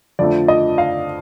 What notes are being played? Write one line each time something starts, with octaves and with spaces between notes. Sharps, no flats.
F2 D3 F3 A3 D5
D#5
F5